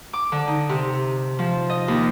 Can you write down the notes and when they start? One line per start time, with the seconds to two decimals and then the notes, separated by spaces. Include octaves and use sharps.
0.13 D6
0.32 D3
0.47 D#4
0.69 C3
1.39 F3
1.69 D#5
1.88 D#2